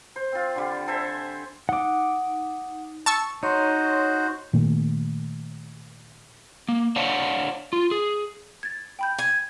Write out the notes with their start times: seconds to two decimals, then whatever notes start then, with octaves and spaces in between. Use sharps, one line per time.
0.16 C5
0.32 C4 F4
0.55 D3 G3
0.88 A4 C5 E5 G#5
1.69 D#4 F#5 D6
3.06 A5 C#6 E6
3.43 D#4 F#4 C5 C#5 C6
4.53 A#2 D#3 A3
6.69 A#3
6.96 D4 C5 C#5 F5 F#5
7.73 F4
7.91 G#4
8.63 G#6 A6
8.99 G5 B5 G6
9.18 G#5